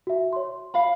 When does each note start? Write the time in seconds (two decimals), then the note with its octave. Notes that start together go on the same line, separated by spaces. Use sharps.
0.07 F#4 E5
0.33 C#5 C6
0.74 F5 B5